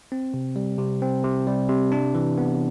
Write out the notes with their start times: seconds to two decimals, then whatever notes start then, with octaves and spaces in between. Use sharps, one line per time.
0.12 C4
0.34 C3
0.56 G3
0.78 C3
1.02 C4
1.24 C3
1.47 G3
1.69 C3
1.92 D4
2.15 E3
2.38 B3